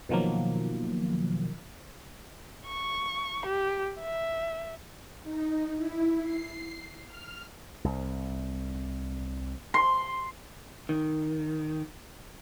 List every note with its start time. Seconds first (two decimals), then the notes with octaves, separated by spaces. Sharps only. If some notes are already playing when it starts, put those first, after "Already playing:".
0.09 B2 D#3 F3 F#3 A#3
2.66 C#6
3.46 G4
4.01 E5
5.23 D#4
5.76 E4
6.23 C7
7.06 F6
7.84 C2
9.74 C6
10.89 D#3